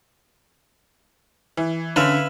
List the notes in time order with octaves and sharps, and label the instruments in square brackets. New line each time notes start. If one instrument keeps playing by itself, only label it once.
[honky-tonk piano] E3
[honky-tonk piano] D3 C#4 [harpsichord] B4 E5 F5